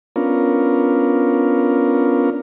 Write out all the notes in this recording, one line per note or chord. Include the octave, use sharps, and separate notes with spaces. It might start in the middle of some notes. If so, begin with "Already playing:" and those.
B3 C#4 D4 F4 A#4